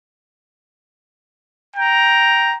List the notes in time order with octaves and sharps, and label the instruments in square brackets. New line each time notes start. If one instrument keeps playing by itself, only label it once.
[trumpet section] G5 A#5